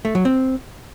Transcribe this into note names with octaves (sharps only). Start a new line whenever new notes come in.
A3
F#3
C4